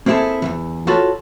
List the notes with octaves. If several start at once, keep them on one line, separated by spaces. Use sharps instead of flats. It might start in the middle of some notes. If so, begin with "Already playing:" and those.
A#3 C4 E4 F#4 G#4 A4
E2 G#2 E3
F4 F#4 A4 B4 C#5